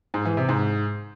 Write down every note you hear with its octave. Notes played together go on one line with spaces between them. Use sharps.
G#2
E3
C3
G#2